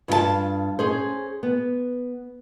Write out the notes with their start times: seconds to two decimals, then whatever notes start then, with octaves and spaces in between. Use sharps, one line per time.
0.08 G2 F4 F#4 A5
0.79 C#4 G#4 C5
1.43 B3